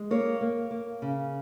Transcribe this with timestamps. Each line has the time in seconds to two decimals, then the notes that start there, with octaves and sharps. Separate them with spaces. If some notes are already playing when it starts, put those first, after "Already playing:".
Already playing: G#3
0.11 A#3 C#5
0.41 A#3
0.71 A#3
1.02 C#3